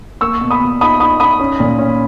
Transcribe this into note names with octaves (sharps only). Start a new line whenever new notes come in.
A#3 C#6 E6
B2
B5 D#6
B2
D#4 B5 D#6
D#4 B5 D#6
D#4 B5 D#6
C#4
A#2
C#4